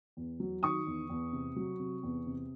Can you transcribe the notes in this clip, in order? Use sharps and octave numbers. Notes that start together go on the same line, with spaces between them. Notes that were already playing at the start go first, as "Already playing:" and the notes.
E2
F#3
D#3 C#6 D#6
E2
E2
C3
F#3
C3
E2
C3